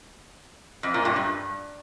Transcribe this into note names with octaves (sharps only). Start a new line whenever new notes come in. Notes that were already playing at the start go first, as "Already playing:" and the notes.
F2
A#2
G2
G2